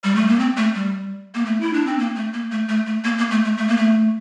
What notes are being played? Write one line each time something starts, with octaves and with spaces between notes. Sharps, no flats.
G3
A3
A#3
C4
A3
G3
A#3
A3
E4
D4
C4
A#3
A3
A#3
A3
A3
A3
A#3
A#3
A3
A3
A3
A#3
A3